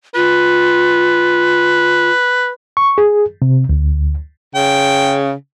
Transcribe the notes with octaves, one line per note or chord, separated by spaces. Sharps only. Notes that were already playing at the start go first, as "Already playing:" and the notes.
F4 B4
C#6
G#4
C3
D2
C#3 G5